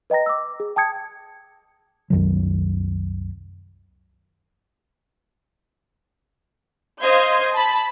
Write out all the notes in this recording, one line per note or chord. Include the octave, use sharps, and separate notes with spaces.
B4 D#5 G5 A#5 A#6
D6 E6
G#4
G5 A5 D#6 G#6 C#7
C2 F#2 D#3 F#3
C5 D#5 F5 C6 G6 G#6
A5 B5